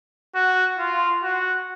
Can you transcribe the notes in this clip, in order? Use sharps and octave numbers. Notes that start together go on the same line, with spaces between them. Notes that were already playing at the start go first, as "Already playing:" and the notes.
F#4
F4
F#4